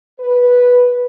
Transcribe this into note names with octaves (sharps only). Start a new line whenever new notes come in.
B4